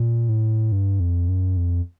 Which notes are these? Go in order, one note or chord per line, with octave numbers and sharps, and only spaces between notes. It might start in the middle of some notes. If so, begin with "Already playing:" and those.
Already playing: A#2
A2
G2
F2
F#2
F2